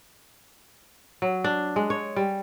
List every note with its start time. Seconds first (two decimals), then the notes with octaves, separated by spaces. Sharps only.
1.22 F#3
1.44 D4
1.76 G#3
1.90 C#5
2.16 G3